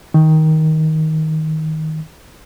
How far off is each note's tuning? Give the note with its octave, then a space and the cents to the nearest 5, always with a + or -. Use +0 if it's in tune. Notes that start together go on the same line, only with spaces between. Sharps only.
D#3 +15